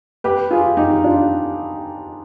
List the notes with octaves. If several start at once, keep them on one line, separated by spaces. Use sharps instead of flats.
G4 B4
F4 G#4
D#4 G4
D4 F4